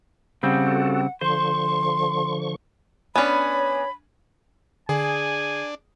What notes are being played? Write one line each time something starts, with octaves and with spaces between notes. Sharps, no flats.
C#3 G3 C4 F#5
F#4 A4
D3 F3 C5 C6 C#6
B3 C#4 D4 C#5 G#5 B5
D3 D4 G#4 G#5